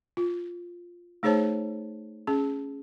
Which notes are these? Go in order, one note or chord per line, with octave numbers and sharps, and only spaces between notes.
F4
A3 D#4 G#4 C5 C#5 A5
C#4 G#4